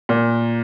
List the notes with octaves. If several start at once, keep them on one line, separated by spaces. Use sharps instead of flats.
A#2